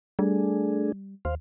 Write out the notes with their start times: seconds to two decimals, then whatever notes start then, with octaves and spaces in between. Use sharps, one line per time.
0.19 G3 A3 D4 G#4
1.25 D#2 C5 F5